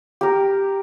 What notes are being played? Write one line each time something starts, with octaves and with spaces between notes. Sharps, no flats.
G4 A#4